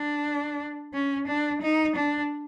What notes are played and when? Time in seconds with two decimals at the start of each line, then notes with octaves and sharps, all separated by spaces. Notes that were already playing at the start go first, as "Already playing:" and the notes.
Already playing: D4
0.93 C#4
1.27 D4
1.62 D#4
1.96 D4